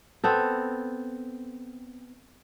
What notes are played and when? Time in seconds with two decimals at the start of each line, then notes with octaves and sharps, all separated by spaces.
0.24 B3 C4 A4